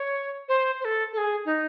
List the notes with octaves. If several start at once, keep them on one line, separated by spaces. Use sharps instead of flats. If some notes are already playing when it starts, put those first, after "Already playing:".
Already playing: C#5
C5
C5
A4
A4
G#4
D#4